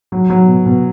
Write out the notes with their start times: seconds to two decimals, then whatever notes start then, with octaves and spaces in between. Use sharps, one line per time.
0.12 F#3
0.30 F#3
0.48 B2
0.66 B2